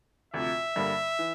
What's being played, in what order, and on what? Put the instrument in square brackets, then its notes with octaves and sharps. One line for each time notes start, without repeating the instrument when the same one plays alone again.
[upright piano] D2 C3 F3 [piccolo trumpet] E5
[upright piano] G2 D3 G3 A#3
E3